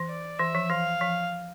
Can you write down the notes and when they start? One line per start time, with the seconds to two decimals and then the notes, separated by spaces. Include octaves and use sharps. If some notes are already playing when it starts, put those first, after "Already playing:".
Already playing: E3
0.09 D5
0.39 E3 E5
0.55 F3
0.70 E3 F5
1.01 F3